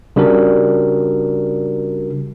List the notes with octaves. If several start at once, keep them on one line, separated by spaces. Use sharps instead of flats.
C#3 G3 D4 F#4 A#4